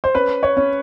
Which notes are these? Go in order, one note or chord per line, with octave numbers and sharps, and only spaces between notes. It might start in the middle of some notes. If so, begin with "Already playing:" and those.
C5
C#4 B4
C#5
C#4